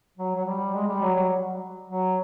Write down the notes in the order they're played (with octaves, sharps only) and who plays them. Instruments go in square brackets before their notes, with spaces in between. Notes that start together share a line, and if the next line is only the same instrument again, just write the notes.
[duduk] F#3
F#3
G3
G#3
G3
F#3
F#3
F#3